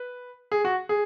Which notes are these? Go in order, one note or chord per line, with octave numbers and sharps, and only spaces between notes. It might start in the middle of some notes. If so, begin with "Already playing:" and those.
Already playing: B4
G#4
F#4
G#4